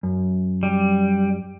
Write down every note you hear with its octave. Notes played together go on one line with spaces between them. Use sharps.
F#2
G3